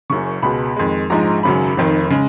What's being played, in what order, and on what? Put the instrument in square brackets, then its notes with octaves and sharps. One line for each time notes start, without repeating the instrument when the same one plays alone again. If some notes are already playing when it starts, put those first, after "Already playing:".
[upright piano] F#1 F#2 C#3 C#6
C#2 B2 G#3 B5
F2 D#3 G#3
A#1 G#2 F3 G#3 A#5
G#1 F#2 C#3 F#3 B5
F1 F2 D#3
C#3 G#3